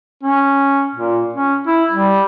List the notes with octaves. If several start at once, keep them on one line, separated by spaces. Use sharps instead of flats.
C#4
A#2
C#4
E4
G3